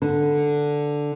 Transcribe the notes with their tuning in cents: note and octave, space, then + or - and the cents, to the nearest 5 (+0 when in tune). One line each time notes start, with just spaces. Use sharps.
D3 +0 B4 +0